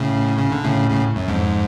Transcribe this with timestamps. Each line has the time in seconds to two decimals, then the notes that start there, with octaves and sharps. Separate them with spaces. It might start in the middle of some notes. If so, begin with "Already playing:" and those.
Already playing: A2 C#3
0.39 C#3
0.52 D3
0.64 A2 C#3
0.90 A2 C#3
1.16 F#2
1.28 F2 G#2